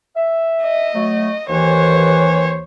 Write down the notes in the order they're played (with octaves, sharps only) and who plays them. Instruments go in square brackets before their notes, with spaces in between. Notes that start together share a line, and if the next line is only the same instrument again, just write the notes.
[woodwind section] E5
[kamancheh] D#5
[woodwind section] F#3 A3
[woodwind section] D#2 E3 [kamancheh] C5 C#5